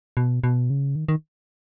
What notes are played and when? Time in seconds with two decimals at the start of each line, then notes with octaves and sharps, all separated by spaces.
0.17 B2
0.44 B2
0.70 C#3
0.96 D#3
1.09 D#3